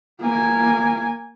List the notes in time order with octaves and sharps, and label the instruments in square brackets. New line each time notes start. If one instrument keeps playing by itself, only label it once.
[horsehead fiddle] A#3 G#5